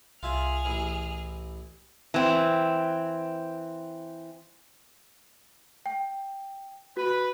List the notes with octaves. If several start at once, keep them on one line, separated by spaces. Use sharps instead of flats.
C2 F4 G#4 E5 G#5 F6
A1 E4
E3 C4
G5
F#4 B4